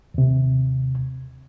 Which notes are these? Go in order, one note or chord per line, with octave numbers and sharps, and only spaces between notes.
D#2 C3